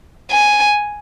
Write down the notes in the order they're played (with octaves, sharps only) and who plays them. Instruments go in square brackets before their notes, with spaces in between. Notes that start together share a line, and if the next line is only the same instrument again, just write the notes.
[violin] G#5